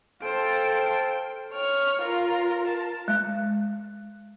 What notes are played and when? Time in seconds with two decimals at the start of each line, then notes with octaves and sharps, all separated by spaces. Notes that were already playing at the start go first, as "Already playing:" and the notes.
0.22 A4 C5 F5 G5 D7
1.52 C#5 F6
2.02 F4 A#4
2.67 A5
3.08 G#3